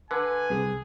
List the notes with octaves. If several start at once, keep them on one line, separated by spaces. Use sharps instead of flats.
D3 B4 G#5
C2 G#4